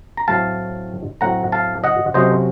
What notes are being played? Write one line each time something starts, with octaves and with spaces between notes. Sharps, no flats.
A#5
A2 F#3 A3 C4 F5 A5
A2 F#3 A3 C4 F#5 A#5
F5 A5
D#5 F#5
C3 F#3 A3 C#4 C5 D#5